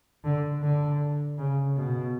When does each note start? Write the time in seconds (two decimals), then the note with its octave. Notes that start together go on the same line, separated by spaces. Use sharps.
0.24 D3
0.63 D3
1.38 C#3
1.77 B2